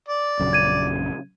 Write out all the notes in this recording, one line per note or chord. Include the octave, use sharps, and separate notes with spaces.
D5
A#1 F#2 C#3
G#6 D#7